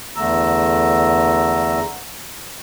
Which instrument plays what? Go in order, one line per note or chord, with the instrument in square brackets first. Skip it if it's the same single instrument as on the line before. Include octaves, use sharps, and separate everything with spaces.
[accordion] E2 D3 A3 A#5 E6